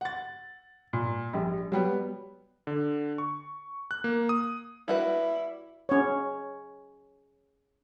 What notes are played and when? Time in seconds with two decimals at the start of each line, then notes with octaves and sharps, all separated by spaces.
0.01 F#5 A6
0.93 A#2
1.33 A#1 G3
1.72 F#3 G3 B3
2.67 D3
3.18 C#6
3.91 F#6
4.04 A#3
4.29 D#6
4.88 G3 E4 F#4 B4
5.89 C#4 C#5